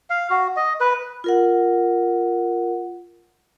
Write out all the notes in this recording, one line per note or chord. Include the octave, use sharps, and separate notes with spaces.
F5
F#4
D#5
B4
F4 A#4 F#5